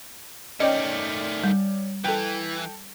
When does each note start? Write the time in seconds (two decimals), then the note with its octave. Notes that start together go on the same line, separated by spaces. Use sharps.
0.60 D#3 A3 C#4 D5 D#5 G5
1.44 G3
2.05 E3 A4 G5